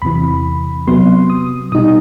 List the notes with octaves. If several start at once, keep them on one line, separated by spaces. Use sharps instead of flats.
E2 C3 E3 B5
C3 F#3 B3 C6
D#6
B2 G3 D#4 D#6